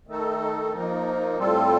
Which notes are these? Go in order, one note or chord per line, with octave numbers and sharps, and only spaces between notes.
D#3 A3 D#4 A4
F3 A#3 D#4
A2 G3 C4 F4 A4